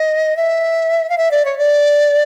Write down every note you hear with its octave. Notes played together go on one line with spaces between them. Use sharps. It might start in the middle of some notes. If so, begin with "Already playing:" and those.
Already playing: D#5
E5
F5
E5
D5
C#5
D5